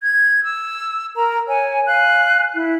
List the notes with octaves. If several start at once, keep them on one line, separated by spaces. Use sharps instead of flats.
G#6
E6
A#4 A#5
C#5 F#5 G#5
F5 G#5 F#6
E4